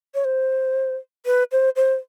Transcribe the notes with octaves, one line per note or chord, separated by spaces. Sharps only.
C#5
C5
B4
C5
C5